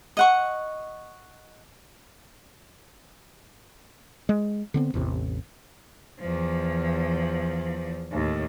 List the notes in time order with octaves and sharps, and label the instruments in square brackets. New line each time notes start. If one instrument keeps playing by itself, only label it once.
[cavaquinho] D#5 F#5 C#6
[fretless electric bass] G#3
D3 B3 C4
A1 E2 C3
[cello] E2 F3
D#2 A2